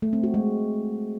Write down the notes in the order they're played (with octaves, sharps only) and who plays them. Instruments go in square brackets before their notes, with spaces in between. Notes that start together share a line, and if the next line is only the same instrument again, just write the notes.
[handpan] A3
C4
F#4
G#3